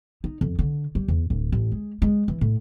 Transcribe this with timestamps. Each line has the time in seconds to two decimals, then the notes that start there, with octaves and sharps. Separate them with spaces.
0.24 D#4
0.41 F2
0.59 D3
0.95 G3
1.08 E2
1.30 D1
1.52 A1
1.72 G#3
2.02 G#3
2.28 E3
2.41 A2